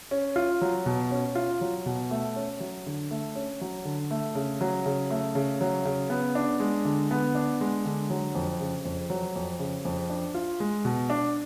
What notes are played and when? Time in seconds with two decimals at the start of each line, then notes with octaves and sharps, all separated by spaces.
0.11 C#4
0.36 F4
0.61 F#3
0.86 B2
1.11 C#4
1.35 F4
1.61 F#3
1.86 B2
2.11 A3
2.36 C#4
2.60 F#3
2.86 D3
3.11 A3
3.36 C#4
3.61 F#3
3.85 D3
4.11 A3
4.35 C#3
4.61 F#3
4.86 C#3
5.11 A3
5.35 C#3
5.61 F#3
5.85 C#3
6.10 B3
6.35 D4
6.60 G#3
6.85 D3
7.11 B3
7.35 D4
7.61 G#3
7.85 D3
8.10 F#3
8.35 F2
8.60 C#3
8.85 F2
9.10 F#3
9.36 F2
9.59 C#3
9.85 F2
10.10 D4
10.34 F4
10.60 G#3
10.85 B2
11.10 D4